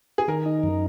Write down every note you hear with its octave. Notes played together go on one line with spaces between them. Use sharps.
G#4
D#3 A#4
D#4
F#2